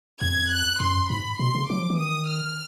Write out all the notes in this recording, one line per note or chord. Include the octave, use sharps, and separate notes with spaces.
F2 G#6
F#6
F#2 C6
G#2 B5
B2 C6
C#3
F#3 D6
F3
E3
D#3 D#6
F6